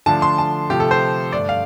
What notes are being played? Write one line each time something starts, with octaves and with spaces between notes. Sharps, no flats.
D3 F3 A3 D4 A5
C6
A5
C3 F3 A3 G4
A4
C5
G2 D3 A3 D4 D5
F5